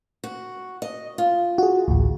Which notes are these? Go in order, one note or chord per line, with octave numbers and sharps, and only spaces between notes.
F#4
D#5
F4
F#4 G#4
A1 D2